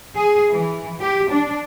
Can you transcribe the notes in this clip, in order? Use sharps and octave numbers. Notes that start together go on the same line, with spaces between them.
G#4
E3
G4
D4